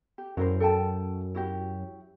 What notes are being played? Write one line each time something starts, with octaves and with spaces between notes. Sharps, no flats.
G4
F#2 E4 A#4 C5
A4 G5 A5
E4 F#4 G4